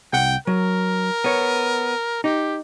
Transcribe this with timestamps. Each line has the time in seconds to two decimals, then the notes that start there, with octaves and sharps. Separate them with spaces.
0.13 C2 F#5 G5
0.47 F#3 A#4
1.24 B3 C#5
2.24 D#4 G4